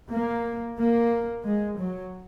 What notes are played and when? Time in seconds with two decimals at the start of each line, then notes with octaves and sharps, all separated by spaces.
0.11 A#3
0.78 A#3
1.45 G#3
1.78 F#3